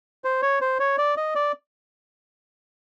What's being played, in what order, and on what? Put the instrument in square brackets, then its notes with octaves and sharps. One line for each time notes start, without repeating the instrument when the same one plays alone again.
[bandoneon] C5
C#5
C5
C#5
D5
D#5
D5